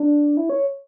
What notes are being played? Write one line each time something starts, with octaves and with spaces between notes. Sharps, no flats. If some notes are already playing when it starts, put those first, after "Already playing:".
Already playing: D4
E4
C#5